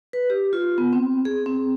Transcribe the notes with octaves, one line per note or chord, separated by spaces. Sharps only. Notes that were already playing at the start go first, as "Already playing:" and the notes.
B4
G4
F4
B3
C4
G#4
C4